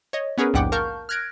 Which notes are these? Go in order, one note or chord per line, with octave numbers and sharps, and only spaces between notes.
C#5 D#5
B3 C#4 G#4 A#4 B4
A#1 D#2 G#2 F#5 G5 D6
A#4 F5 A5 C#6 F6 G6
F6 F#6 G#6 A#6 D7